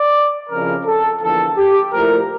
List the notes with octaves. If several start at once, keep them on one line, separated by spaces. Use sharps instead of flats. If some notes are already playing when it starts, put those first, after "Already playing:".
Already playing: D5
F2 C#3 F3 C#4 E4 A#4
A4
E2 D3 F3 A#3 A4
G4
A#2 F3 A3 E4 A#4